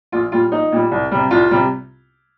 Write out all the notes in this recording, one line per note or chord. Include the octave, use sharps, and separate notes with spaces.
A#1 F4
A#2 G3 F4
A#1 D#4
A#2 G3
C2
C3 G3
C2 F4
C3 G3